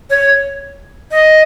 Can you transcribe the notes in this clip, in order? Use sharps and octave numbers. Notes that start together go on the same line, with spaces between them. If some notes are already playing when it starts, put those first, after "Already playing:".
C#5
D#5